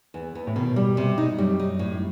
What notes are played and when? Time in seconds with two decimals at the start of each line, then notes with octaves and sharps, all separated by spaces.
0.14 E2
0.35 E2
0.47 A2
0.56 B2 D#3
0.76 G3
0.97 C3
1.18 D#4
1.38 F#2 G3
1.60 D#4
1.79 A2